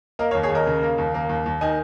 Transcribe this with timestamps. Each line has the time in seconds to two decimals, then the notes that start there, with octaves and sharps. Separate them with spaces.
0.19 A#3 A#4 D#5
0.31 C#5 F5
0.35 D#2
0.43 G#4 C#5
0.50 D#2 A#4 D#5
0.67 C#3
0.83 A#3
0.98 D#2
1.14 A#3
1.29 D#2
1.46 D#2
1.61 D#3 D#5 G#5